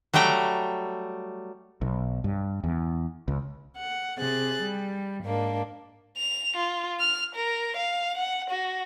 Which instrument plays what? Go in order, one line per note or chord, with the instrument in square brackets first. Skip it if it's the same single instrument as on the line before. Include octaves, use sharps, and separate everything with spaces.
[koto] F#3 G3 A3 G5 A#5
[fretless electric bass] B1
G2
E2
C#2
[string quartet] F#5
C3 G#4 F#6 A6
G3
G#2 A#3 D4
[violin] F7
F4
F6
A#4
F5
F#5
F#4